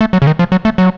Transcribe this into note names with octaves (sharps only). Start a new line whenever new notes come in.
A3
F#3
C#3
D#3
F3
F#3
A3
F#3